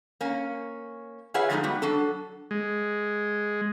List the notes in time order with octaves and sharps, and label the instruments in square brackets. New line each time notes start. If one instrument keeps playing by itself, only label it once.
[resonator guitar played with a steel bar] A#3 C#4
F4 G#4 B4 C#5 E5 F#5
D3 F3 G#3 A3 D4 D#4
G3 B3 F#4
F#3 D4 A4
[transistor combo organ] G#3